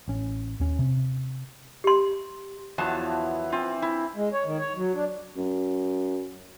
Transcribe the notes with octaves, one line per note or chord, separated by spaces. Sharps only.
A1 C#4
D#2 C#4
C3
G4 C6
E2 F3 F#3 B3 E4 A5
E3 C4 F4
E4
G#3
C#5
D#3
C#5
F#3
D4
F#2